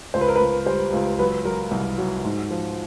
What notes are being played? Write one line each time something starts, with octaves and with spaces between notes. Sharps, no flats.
C#2 C5
B4
A#4
B4
C#2
G3 C5
C#2
F#3 B4
F#3 A#4
C2
F#3
G#2
F3